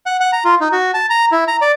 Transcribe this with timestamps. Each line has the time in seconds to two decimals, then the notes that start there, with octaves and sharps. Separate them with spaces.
0.06 F#5
0.20 F#5
0.33 A#5
0.45 F4
0.61 D#4
0.72 F#4
0.94 A5
1.10 A#5
1.32 E4
1.48 A#5
1.61 D5